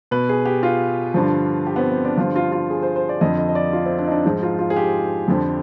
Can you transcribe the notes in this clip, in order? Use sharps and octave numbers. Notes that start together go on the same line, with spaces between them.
B2 B4
G#4
G4
F4
G2 D3 F3
G4
B3
C4
C4
D4
G2 D3 F3 F4
F4
F4
G#4
C5
C5
D5
F2 D3 F3 D#5
D#5
D#5
D5
F4
C4
D4
D#4
D4
G#2 F3 D#4
F4
F4
G#4
G4
F2 D3 F3